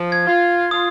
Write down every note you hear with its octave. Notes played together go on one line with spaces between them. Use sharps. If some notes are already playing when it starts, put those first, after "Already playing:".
Already playing: F3
G#6
F4
F4 D#6